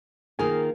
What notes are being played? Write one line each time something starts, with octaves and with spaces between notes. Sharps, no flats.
D#3 A#3 F4 G#4 A#4 G#5